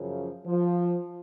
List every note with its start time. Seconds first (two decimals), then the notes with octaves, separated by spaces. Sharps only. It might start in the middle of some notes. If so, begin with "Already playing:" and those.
Already playing: F#2 C#3 F3
0.46 F3